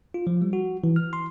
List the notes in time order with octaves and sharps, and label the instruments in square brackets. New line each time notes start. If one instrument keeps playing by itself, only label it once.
[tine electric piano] F4
F3
G3
F#4
E3
F6
C6